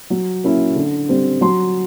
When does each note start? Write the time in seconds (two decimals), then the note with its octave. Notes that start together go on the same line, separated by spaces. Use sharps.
0.10 F#3
0.44 A#3 C#4 E4
0.76 D3
1.09 G3 C4
1.41 F#3 C6